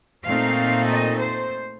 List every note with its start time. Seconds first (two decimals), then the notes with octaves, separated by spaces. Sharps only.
0.24 A#2 A3 C4 D#4 F5
0.88 D#5
1.20 C5